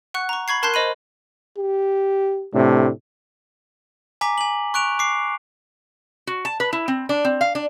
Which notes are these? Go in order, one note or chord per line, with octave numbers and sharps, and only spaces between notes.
F#5 C#6 F#6
A#5 C#6
B5 C#6 G#6 C7
A#4 A5 C6 F#6 G6 C7
C5 D#5 B5 D#7
G4
A2 C3 A3 D4
G#5 A#5 D6 B6
G#5 F#7
C#6 F#6 D7 F7
D6 C7
F#4
A5
B4
E4
C4
D4
C4
F5
D4